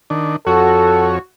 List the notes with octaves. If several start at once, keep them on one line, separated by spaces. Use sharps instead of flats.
D#3 D4
F2 F#4 A4 C#5